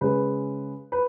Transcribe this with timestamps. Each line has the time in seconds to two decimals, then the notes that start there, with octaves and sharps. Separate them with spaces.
0.01 C#3 G#3 B4
0.92 B4